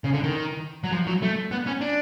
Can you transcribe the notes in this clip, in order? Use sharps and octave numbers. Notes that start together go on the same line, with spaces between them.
C#3
D3
D#3
F#3
F3
F#3
A3
B3
C#4
D4